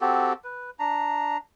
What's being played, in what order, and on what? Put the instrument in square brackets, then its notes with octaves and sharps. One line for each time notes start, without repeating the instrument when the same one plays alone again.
[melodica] C4 F#4 G4 A4
B4
D4 A#5